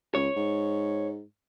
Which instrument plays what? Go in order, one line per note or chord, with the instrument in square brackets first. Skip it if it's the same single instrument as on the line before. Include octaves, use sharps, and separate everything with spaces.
[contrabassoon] C#2 [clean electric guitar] C#5
[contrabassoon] G#2